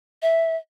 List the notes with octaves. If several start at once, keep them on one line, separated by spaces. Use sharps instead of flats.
E5